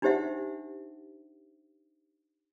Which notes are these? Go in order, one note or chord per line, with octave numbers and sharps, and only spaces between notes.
D4 D#4 G4 C5 E5 F#5